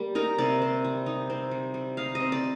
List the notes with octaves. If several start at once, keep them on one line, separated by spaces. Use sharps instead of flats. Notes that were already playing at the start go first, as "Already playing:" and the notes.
Already playing: G3 A#3
D#4 A#4
C3 D5
C4
G3
D#4
C4
G3
G3
D#4 F5
D#5
C4
D5